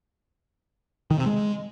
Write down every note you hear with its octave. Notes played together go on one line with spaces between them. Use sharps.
D#3
C3
G#3